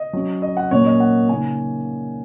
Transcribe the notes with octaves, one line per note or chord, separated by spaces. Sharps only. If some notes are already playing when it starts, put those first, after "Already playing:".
Already playing: D#5
F#3 C#4
D#5
F#5
A#2 F#3 A#3 C#4 C#5
D#5
F#5
C#3 A#3 D#4 G#5